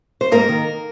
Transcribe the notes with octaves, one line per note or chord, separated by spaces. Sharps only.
C5
G#2 A#3 A#4
D#3